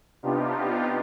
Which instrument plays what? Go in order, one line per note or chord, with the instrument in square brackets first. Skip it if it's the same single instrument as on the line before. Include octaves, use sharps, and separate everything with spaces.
[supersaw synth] C3 B3 D4 D#4 F4 G4